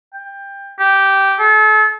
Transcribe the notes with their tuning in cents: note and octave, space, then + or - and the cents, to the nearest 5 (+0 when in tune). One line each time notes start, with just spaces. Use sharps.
G5 +20
G4 -10
A4 -40